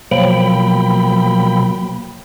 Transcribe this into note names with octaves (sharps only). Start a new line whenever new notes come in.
B2 F3 F#3 A#3 G5 B5